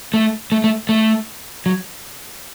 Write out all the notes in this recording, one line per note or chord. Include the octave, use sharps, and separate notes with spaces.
A3
A3
A3
A3
F#3